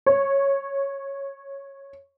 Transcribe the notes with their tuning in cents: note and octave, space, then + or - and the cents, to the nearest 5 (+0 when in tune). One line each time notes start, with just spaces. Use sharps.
C#5 -10